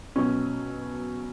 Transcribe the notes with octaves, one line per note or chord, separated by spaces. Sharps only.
B2 F#3 C#4